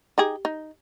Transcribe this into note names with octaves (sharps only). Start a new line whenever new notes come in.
D#4 G4 G#4
D#4